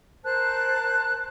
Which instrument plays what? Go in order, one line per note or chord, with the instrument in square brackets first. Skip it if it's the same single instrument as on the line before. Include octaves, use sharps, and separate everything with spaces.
[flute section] A#4 C5 A5 F#6